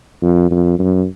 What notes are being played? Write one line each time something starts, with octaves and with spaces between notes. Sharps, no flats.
F2
F2
F#2